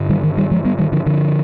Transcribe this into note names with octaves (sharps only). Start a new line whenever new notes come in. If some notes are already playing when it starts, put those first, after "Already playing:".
Already playing: G2 D3
D#3 G3
D#3
D#3 G3
F3 G#3
G3 B3
D#3 G3
D3 F3
D3 F3